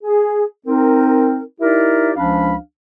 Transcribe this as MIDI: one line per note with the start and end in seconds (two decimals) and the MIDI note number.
0.03 0.44 68
0.66 1.43 60
0.66 1.43 63
0.66 1.43 70
1.61 2.12 63
1.61 2.12 64
1.61 2.12 67
1.61 2.12 70
1.61 2.12 74
1.61 2.12 76
2.16 2.55 37
2.16 2.55 53
2.16 2.55 61
2.16 2.55 62
2.16 2.55 77
2.16 2.55 83